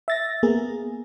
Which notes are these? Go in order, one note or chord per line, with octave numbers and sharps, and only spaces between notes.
E5 A6 A#6
A#3 B3 G#4 A#4